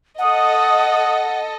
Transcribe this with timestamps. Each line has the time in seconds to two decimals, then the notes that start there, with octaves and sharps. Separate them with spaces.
0.18 A4 D#5 F#5 D#6